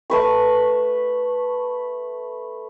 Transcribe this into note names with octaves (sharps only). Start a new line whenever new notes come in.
A3 B4 C#6